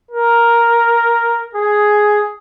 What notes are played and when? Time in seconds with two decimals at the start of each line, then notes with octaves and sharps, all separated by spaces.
0.11 A#4
1.55 G#4